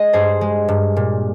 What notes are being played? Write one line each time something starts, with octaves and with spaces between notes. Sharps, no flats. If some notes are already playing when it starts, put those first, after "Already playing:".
Already playing: G#3 D#5
G2 G#4 C5
G#3
G2
A#2